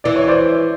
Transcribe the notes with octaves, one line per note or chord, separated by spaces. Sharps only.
E3 D5
C#5
C5 D5